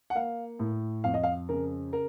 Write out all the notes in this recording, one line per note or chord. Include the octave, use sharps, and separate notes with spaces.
F#5
A#3 F5
A2
F2 F5
D#5
F5
C#3 A#4
A#4